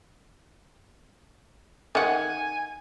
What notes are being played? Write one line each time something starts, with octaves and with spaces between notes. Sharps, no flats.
D#3 F#5 G#5